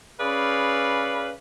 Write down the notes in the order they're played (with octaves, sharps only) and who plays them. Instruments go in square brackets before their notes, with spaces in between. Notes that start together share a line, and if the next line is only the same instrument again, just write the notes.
[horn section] C#4 G#4 B4 D5 F5 B5